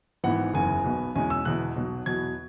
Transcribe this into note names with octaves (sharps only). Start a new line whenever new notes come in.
G#1 G#2 E3 B3 F#5
F#1 E2 C#3 G#5
B1 B2 B3
E2 B2 G#3 C#4 G#5
E6
E1 E2 B2 F#6
B1 B2 F#3
E2 B2 F#3 B3 G#6